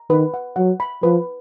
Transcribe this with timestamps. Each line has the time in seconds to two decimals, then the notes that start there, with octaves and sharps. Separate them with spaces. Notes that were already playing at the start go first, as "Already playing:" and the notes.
Already playing: A#5
0.10 D#3 B4
0.34 F#5
0.56 F#3 F#5
0.80 B5
1.03 F3 B4